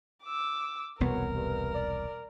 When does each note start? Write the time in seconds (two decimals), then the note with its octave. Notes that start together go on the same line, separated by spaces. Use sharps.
0.24 D6 E6
1.00 E1 C2 B3 F#4 A#4 B4 C#5
1.35 G2
1.75 D5